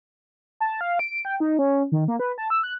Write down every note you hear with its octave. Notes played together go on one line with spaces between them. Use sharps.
A5
F5
D7
G5
D#4
C#4
D#3
A#3
B4
A5
E6
F#6